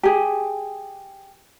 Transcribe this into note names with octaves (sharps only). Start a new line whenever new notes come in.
G4 G#4